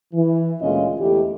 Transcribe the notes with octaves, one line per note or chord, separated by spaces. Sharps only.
E3
D2 A#2 G#3 C#4 F4 D#5
E2 A3 E4 G4